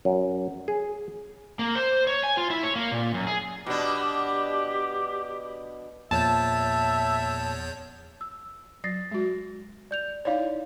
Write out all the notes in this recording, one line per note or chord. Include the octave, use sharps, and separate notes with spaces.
F#2
G#4
A#3
C5
C#5
G#5
F4
E4
C#5
A#3
A#2
F#2
G#4
B2 D4 G4
E2 A#2 F3 A#3 C#5 E5 A5 G6
E6
F#3 A6 A#6 C7
G#3 F#4
D5 G6 F7
D#4 E4 C#5 D5 F5